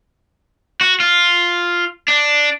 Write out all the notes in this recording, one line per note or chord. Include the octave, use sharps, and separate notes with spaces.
F#4
F4
D4